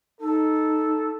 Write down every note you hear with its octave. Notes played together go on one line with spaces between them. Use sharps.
D#4 A4